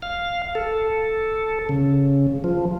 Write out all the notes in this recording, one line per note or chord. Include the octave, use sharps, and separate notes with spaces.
F5
A4
C#3
F3